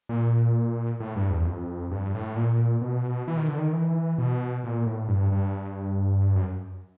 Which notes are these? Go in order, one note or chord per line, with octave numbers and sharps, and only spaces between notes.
A#2
A2
G2
E2
F2
G2
A2
A#2
B2
E3
D#3
D3
D#3
E3
B2
A#2
A2
G2
G2
F#2